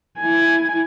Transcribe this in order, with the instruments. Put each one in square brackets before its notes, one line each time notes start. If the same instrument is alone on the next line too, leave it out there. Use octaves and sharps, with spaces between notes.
[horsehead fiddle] E4 G#5